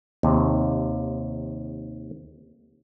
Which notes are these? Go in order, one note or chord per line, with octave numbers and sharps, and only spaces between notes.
D#2 C3